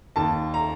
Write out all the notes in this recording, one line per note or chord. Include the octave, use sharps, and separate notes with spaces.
D#2 A5
A#5